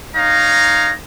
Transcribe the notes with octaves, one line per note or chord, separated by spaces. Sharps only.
D#4 C#5 F5 A#5